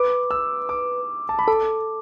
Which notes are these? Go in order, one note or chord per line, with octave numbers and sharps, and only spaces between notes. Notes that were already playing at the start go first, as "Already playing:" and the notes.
Already playing: B4 D6
E6
D6
A5
B5
A4 D6